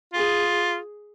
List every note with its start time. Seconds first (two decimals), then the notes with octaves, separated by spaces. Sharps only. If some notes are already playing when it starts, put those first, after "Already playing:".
0.13 F4 G#4